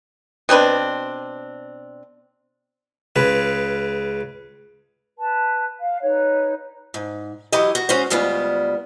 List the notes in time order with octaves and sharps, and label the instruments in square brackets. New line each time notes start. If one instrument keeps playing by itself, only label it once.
[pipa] B2 C4 D4 B4
[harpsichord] C#2 C#3 B4
[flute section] B4 A5
F5
D#4 B4 C#5
[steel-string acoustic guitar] G#2
E3 F#3 E4 G4 D#5
F#4
G#3 C#4 F#4 C5
D2 G3 G#3 B3 F4